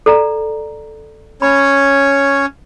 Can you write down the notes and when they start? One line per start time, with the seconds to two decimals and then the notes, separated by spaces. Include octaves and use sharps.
0.06 A4 D5 A#5
1.42 C#4 C#5 B5